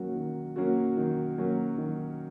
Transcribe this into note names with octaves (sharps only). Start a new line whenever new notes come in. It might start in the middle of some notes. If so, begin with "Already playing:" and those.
Already playing: D#3 F#3 A#3 C#4 F#4
D#3
F#3 A#3 C#4 F#4
D#3
F#3 A#3 C#4 F#4
D#3